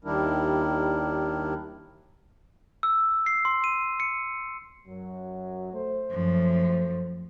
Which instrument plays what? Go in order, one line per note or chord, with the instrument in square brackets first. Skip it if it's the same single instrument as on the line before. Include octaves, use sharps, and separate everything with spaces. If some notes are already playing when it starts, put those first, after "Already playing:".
[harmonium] D#2 D#3 G3 D4 E4 A#4
[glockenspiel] E6
C7
C6
D#7
C#7
[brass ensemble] F#2 F#3
A3 C5
[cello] F#2 F3